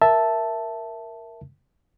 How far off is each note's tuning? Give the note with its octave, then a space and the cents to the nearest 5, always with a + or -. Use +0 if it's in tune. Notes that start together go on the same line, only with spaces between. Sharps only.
A#4 +0 E5 +0 A5 +0